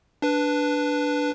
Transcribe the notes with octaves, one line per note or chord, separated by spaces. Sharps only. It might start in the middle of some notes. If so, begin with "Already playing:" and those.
D4 B4